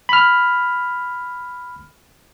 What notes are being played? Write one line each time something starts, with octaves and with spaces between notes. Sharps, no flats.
B5 F6